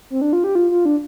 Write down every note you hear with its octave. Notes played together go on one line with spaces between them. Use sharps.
C4
D4
F4
G4
F4
F4
D4